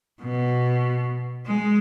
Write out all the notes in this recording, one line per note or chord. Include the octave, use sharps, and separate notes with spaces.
B2
G#3